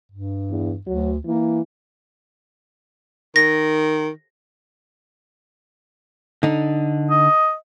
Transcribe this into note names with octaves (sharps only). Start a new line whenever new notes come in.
G2
E2
D2 F#3
E3 A#3
D#3 A#6
D3 D#4
D#5